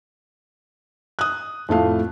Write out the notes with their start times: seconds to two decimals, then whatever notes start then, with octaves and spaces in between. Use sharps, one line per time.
1.19 D#6 F#6
1.69 F2 A2 A3 F5